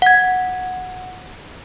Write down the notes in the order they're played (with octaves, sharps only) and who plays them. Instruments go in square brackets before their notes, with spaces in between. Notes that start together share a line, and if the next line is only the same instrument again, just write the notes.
[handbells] F#5 G#6